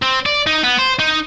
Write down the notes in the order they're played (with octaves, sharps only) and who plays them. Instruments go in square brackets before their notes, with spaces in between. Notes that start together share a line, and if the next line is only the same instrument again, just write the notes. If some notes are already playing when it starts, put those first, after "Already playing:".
[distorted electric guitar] C4
D5
D#4
B3
C5
D#4